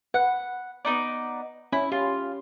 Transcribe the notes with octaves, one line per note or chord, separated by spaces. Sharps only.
B4 F#5
B3 D#4 D5
C#4 E4
F4 G4